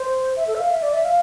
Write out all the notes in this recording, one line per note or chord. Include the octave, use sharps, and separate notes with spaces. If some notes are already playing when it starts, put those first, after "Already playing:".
Already playing: C5
E5
A4
E5
F5
E5
D5
E5
F5